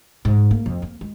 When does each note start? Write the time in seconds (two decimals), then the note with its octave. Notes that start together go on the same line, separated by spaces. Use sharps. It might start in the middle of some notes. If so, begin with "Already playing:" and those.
0.25 G#2
0.51 A#3
0.66 F2
0.82 A#3
1.01 G#3